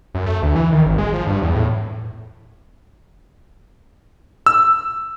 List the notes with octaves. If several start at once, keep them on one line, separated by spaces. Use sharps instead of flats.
F#2
A3
D2
E3
D#3
G#1
G#3
F3
G2
E2
A2
E6